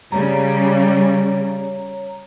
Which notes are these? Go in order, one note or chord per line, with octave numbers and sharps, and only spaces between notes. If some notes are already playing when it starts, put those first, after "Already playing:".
C#3 G3 C#5 A#5